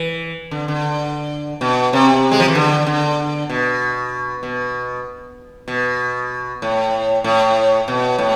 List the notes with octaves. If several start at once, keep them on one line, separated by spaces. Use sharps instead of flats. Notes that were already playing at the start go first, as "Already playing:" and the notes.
Already playing: E3
D3
D3
B2
C3
G#3
F3
E3
D3
D3
B2
B2
B2
A2
A2
B2
A2